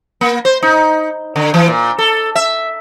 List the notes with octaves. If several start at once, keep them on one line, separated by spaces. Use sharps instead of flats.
A#3
C5
D#4
D3
E3
A#2
A4
E5